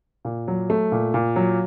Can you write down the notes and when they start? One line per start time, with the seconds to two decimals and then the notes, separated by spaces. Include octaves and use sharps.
0.25 A#2
0.48 F#3
0.70 A3
0.92 A#2
1.14 A#2
1.36 F#3